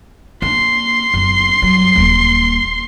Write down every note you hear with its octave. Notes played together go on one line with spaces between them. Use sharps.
A#3 D4 C6
F#1 B3
G2 F#3
D#1 A#3